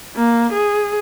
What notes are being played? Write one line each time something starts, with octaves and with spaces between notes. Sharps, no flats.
A#3
G#4